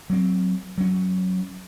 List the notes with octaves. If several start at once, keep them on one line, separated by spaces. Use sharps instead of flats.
F#3 C4
F#3 C#4